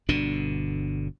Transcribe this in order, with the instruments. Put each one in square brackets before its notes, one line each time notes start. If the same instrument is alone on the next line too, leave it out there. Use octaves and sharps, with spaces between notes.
[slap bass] G1 B2 D3 D4